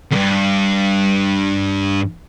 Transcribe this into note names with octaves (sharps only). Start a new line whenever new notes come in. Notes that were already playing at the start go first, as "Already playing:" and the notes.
E2 G2